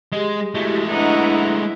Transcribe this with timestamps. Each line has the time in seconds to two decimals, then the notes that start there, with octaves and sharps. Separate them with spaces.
0.12 G#3 G4 G#4
0.54 G#3 A3 E4 F#4 G4
0.89 D4 E4 B4 D#5 F#5 A#5